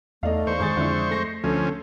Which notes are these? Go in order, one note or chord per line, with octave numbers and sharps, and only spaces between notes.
E2 A3 D#4 D5 F5
E2 C5 C#6
G#1 G#3 G#4 A6
F2 D3 E4
A3 A#6 C7
D2 F3 C#4 A4